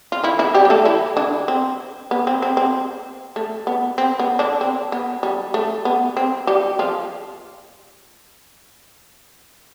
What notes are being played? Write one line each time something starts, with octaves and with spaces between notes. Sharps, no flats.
F4
E3 E4
E3 E4
G3 G4
G4
A3 A4
E3 E4
D3 D4
C4
B3
C4
C4
C4
A3
B3
C4
B3
D3 D4
C4
B3
G3
A3
B3
C4
G3 G4
F3 F4